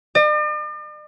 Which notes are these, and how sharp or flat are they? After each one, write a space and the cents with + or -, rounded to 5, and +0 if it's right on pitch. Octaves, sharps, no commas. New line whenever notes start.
D5 +45